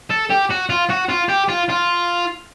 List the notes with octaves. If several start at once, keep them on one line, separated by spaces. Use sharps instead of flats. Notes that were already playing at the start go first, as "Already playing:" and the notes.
A4
G4
F#4
F4
F#4
F4
G4
F4
F4